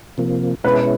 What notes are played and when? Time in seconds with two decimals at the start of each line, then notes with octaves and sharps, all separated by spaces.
0.18 C3 F3 A#3
0.64 B2 G#3 C#4 E4 B4